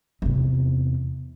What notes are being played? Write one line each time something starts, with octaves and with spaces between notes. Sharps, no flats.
E2 C3